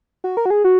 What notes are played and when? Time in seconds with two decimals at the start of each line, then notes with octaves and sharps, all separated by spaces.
0.24 F#4
0.37 A#4
0.46 F#4
0.50 G#4
0.64 F#4